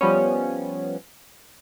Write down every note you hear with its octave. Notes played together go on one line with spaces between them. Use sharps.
F3 G3 B3 C#4